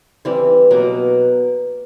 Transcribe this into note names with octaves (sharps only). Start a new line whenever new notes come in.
E3 G3 C4
B2 F#3 A#3